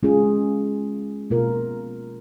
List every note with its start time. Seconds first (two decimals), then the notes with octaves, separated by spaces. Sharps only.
0.03 G#3 C#4 F4 G#4
1.30 B2 A#3 F4 A#4